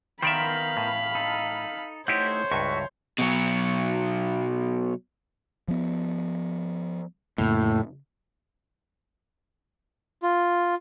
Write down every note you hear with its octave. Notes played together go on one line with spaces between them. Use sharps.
D#3 B3 A#4 C5 D5 E5 F5 B5
A2
D#4 A4
A3 D#4 E4 G4 C5 C#5 F#5 G6
C#2 G2 F#4 E5 C#6
B2 F#3
F3 B3
F2 A2 C#3 A#3
F4